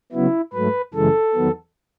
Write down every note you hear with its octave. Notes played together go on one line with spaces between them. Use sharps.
C#3 F#3 B3 E4
G#2 F#3 A3 B4
F#2 C#3 E3 G#3 A4
E2 D#3 F#3 B3